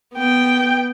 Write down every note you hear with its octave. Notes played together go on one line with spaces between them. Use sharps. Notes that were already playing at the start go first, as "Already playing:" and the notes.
B3 G5